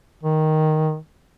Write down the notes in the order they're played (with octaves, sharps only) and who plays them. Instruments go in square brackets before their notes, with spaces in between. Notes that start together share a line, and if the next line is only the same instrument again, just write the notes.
[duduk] D#3